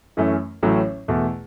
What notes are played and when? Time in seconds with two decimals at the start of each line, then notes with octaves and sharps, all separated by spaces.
0.17 F#2 E3 A3 C#4
0.63 A1 A2 F#3 A3 C#4
1.08 E2 B2 A3